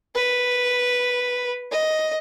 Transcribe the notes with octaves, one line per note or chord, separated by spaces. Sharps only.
B4
D#5